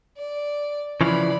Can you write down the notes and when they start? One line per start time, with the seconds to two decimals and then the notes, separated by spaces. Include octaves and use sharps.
0.17 D5
1.01 C#3 E3 F3 D5 B5